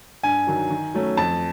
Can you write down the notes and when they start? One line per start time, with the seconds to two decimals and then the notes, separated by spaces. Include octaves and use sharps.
0.23 G2 G#5
0.47 D#3 F#3
0.70 D#3
0.94 F#3 A3 C#4
1.17 F2 A5